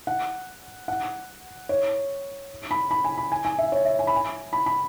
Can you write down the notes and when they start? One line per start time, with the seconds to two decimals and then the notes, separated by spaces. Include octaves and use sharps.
0.07 F#5
0.88 F#5
1.69 C#5
2.71 B5
2.91 B5
3.04 G#5
3.18 B5
3.32 G#5
3.45 G#5
3.59 E5
3.72 C#5
3.85 E5
3.99 G#5
4.07 B5
4.16 G#5
4.53 B5
4.66 B5